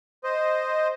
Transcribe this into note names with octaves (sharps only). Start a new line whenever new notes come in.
C5 D#5